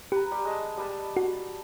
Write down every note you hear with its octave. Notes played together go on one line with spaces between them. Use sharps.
G4 B4 A#5
G3
G#3 D#5 A5
G3 B4 A5
F#4